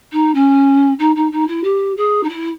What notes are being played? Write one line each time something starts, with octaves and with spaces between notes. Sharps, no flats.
D#4
C#4
D#4
D#4
D#4
E4
G4
G#4
D#4
E4